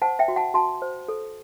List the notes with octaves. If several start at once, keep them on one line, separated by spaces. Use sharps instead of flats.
C5 F#5 A5
E5 G5
F#4
F#5 A5
F#4 A5 C6
C5
A4